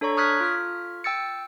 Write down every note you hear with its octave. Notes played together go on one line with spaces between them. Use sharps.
D4 A4 C#5 A#5 C#6
C#6 D#6 F6 F#6 G#6 B6
F4 F6
G5 E6 A6 C#7